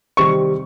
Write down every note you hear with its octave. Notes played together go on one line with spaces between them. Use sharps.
C3 D#3 G3 C4 C#6